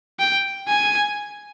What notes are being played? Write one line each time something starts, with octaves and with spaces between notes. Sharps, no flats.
G5
G#5